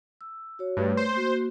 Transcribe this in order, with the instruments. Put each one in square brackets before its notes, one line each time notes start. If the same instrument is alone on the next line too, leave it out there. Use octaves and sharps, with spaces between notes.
[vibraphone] E6
F#4 C#5
[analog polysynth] G2 [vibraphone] A3 B4 C#5
[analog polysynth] C5
[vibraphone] A#3 F#4